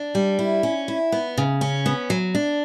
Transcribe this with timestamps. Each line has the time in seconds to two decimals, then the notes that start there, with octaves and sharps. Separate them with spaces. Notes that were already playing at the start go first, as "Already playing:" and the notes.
Already playing: D4
0.15 G3
0.39 E4
0.63 C#4
0.88 E4
1.12 B3
1.38 C#3
1.61 C#4
1.86 B3
2.10 F#3
2.35 D4